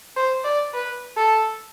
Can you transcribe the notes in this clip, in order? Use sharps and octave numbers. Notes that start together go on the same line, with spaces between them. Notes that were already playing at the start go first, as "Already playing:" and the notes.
C5
D5
B4
A4